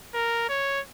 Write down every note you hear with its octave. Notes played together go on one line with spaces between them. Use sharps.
A#4
C#5